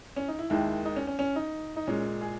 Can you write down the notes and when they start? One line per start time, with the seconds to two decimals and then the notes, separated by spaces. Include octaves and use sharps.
0.16 C#4
0.28 D#4
0.39 E4
0.50 D#2 D#3 G#3 E4
0.85 D#4
0.96 C#4
1.07 C#4
1.19 C#4
1.36 D#4
1.76 D#4
1.87 A#2 G#3 C#4
2.21 G#4